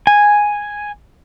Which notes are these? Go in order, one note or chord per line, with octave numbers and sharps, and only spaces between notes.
G#5